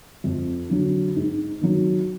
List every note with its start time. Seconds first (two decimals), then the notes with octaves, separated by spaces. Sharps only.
0.24 F2
0.69 D3 F#3
1.16 G#2
1.61 D#3 F#3